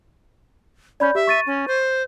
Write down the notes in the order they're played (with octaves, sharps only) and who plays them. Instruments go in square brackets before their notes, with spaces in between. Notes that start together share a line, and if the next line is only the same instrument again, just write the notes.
[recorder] C#4 [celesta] D5 B5 G6
[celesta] G4 [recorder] E5
[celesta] C#6 A6 D#7
[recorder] C#4
C5